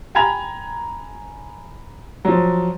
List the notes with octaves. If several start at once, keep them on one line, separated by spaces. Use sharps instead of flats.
G5 G#5 A#5 B5 G#6 F7
F3 F#3